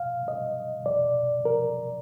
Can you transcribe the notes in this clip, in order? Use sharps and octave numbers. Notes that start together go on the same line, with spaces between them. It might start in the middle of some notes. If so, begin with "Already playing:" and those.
Already playing: F5
D#5
D5
A#4